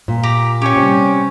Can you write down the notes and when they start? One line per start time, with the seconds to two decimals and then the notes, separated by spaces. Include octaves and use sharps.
0.08 A#2
0.23 G4 A#5
0.62 C#4 G4 C#5
0.77 C3 G3